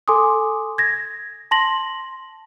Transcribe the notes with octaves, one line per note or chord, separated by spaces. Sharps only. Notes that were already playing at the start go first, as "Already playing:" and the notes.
A4 G#5 C6 D6 D#6
G#6 A#6
A5 C6 A#6 F#7